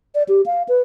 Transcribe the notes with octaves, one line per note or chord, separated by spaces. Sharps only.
D5
G4
F5
B4